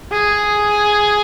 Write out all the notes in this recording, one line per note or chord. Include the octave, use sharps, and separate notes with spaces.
G#4